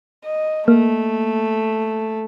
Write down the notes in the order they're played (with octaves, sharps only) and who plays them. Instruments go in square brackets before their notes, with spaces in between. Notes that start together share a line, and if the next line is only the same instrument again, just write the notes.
[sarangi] D#5
[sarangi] A3 [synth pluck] A#3